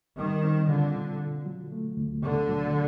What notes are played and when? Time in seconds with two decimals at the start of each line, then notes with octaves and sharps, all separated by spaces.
0.18 D#3 G3
0.44 C4
0.69 D3 F4
0.96 B2
1.21 D3
1.46 F#3
1.72 A3
1.97 D2
2.23 B2 D3
2.49 F#3